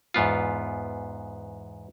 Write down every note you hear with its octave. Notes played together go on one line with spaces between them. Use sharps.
E2 G#2 B3 F4